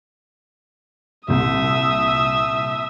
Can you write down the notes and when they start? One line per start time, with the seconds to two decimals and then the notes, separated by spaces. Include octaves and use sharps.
1.28 C2 A#2 E5 D#6